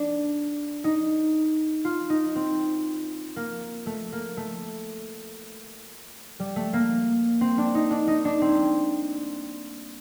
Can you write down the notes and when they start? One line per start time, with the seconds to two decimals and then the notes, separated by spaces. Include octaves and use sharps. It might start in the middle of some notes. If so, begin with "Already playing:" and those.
Already playing: D4
0.84 D#4
1.85 F4
2.10 D#4
2.36 C4
3.36 A#3
3.86 A3
4.12 A#3
4.37 A3
6.40 G3
6.56 A3
6.73 A#3
7.41 C4
7.58 D4
7.75 D#4
7.91 D4
8.08 D#4
8.25 D4
8.42 C4